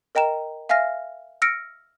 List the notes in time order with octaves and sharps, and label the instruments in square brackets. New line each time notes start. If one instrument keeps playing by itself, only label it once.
[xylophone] A#4 D#5 G5 A#5 E7
E5 F5 G#5 F6 A#6
E6 F6 A#6 C#7 D7